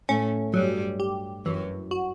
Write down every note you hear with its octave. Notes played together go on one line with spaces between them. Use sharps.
A2 A3 C#4
G2 F#3 G3
G4
F#2 E3 F#3
F#4